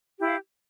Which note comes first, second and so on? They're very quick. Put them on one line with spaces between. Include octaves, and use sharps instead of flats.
G4 E4 F5